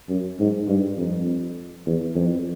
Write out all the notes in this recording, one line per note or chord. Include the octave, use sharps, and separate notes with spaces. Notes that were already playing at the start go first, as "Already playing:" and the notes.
F#2
G#2
G2
F2
E2
F2